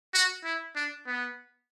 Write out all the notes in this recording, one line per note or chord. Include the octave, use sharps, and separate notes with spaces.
F#4
E4
D4
B3